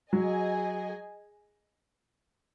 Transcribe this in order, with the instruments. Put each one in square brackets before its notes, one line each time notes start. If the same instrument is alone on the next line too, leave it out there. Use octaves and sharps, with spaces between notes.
[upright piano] F#3 [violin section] G#4 D#5 G#5